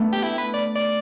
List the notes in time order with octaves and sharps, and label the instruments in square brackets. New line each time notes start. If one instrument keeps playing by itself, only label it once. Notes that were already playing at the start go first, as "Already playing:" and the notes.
Already playing: [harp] A3 B3 D4
[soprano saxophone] G4
E4
B4
D5
D5